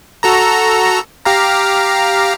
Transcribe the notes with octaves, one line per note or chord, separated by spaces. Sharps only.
F#4 A4 A#5
G4 F5 A#5